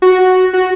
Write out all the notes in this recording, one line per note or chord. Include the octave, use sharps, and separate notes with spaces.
F#4
F#4